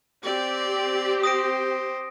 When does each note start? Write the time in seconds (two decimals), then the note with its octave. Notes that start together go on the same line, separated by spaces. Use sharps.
0.23 C4 G4 D5
1.23 C5 D#6 A#6 D7